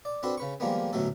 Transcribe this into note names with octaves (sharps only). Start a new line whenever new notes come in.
D5
C4 D4 F#4 A4 B4
C#3 B4 C#6
D#3 F3 G3 G#3 A#3 B3
A1 D2 B2 F#3 A3 A4